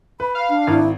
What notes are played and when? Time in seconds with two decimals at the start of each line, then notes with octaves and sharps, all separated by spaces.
0.20 B4 B5
0.35 F5
0.50 D4
0.67 G#1 E4